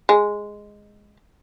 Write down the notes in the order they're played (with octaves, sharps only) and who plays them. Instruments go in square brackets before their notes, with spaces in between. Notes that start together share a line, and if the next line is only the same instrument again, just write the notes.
[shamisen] G#3